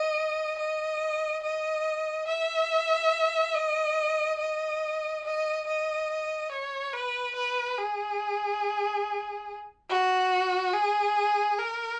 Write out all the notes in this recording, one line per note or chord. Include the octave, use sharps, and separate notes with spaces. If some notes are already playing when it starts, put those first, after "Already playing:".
Already playing: D#5
D#5
D#5
E5
D#5
D#5
D#5
D#5
C#5
B4
B4
G#4
F#4
G#4
A#4